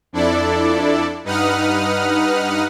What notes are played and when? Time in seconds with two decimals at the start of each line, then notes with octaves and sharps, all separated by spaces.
0.13 F2 D4 E4 A4 D5
1.24 G2 D#4 B4 F#5 D#6 F6